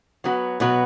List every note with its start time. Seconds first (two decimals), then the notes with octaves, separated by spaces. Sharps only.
0.24 F#3 B3 F#4 B4
0.60 B2 F#3 B3 F#4 B4